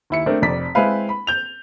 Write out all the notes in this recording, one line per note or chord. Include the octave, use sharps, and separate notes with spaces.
D#2 E4 C#7
A3 C4 D4 A#4
F1 F2 D5 B6
G#3 C4 E4 B4 F5
B5
G6 F7